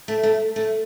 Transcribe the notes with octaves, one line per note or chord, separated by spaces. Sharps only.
A3
A3
A3